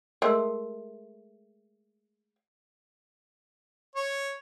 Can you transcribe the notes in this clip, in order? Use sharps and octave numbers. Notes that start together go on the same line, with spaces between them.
G#3 A3 A#4 C6 E6
C#5